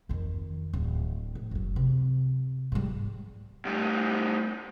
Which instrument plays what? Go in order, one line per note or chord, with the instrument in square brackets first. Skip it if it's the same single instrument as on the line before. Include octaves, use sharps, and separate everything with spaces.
[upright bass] F2 D#3
D1
A2
F#1 F#3
C3
G#2 G3
[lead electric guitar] A2 G3